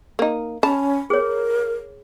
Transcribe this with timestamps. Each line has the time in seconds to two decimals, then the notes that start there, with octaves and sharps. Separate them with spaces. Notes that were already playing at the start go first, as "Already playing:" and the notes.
0.19 A#3 D#4
0.63 C#4 A5 B5
1.10 G#4 A#4 C#5